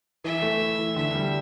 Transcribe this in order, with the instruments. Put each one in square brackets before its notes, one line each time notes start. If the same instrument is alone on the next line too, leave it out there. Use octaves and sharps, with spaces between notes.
[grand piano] E3 [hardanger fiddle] E5
[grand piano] A3
E4
E3
[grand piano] D3 [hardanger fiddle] E5
[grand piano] G3